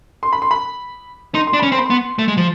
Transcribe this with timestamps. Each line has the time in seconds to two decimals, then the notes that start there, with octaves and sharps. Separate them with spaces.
0.23 C6
0.33 B5
0.42 C6
0.51 B5
1.34 D#4 C6
1.47 C6
1.53 D4
1.59 C#4 B5
1.72 C4 C6
1.78 B5
1.86 B3 C6
2.19 A3
2.28 G#3
2.37 F3